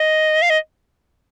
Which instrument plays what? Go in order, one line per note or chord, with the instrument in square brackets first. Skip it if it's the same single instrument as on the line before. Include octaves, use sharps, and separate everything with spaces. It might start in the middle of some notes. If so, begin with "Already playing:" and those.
Already playing: [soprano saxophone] D#5
F5
D#5